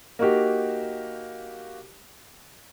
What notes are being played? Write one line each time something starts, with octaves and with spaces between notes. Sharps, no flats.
A#3 D#4 F#4 G4